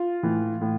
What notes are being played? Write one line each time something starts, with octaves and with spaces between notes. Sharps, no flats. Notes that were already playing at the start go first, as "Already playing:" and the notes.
Already playing: F4
A2 E3
A2